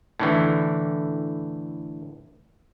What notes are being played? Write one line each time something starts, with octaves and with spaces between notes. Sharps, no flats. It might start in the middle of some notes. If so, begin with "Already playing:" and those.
A2 D3 E3